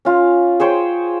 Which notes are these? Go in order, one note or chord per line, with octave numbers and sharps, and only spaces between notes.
C#4 F4
G#4 C5 C#5 G5